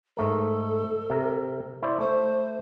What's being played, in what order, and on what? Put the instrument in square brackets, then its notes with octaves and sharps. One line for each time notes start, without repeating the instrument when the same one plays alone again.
[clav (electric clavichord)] G#2 A3 A#4 [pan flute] A4
[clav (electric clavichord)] C3 A#4
E4 C5 D5
[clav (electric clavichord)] A3 [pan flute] C5